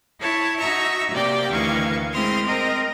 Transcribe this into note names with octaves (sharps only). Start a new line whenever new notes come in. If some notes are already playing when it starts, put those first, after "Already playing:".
E4 C#5 A5
D#4 F#4 E5 A#5 C#6
C3 A#3 G4 D5 G5
D2 D#3 E3 F5 C#6 G#6
G#3 C4 E4 C6 D#6 F6
C4 A#4 D#5 A#5